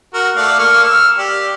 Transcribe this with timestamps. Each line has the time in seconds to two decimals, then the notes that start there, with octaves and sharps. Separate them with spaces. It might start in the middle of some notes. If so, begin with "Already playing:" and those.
0.14 F#4 A#4
0.37 A3 D5 F5
0.59 A#3 C#6 F6
0.84 E6 F6
1.18 G4 D5